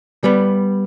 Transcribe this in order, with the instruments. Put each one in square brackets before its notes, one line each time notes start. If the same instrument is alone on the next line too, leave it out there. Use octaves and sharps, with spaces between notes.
[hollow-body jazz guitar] G3 B3